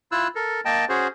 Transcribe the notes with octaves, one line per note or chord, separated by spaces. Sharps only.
E4 F4 E6 F#6
A4 A#4
A#3 D#5 G5 A5
C#4 F#4 G#4 C5